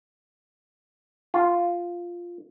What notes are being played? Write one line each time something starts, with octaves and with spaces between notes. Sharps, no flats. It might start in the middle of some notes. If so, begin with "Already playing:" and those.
F4